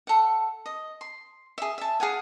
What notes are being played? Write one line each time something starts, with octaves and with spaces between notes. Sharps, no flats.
A4 F#5
D#5
C6
G#4 E5
E5 A5
G#4 F5 F#5 G#5